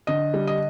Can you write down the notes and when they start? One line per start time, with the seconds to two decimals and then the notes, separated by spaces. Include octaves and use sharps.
0.07 D3 D#5
0.34 G3
0.47 D#5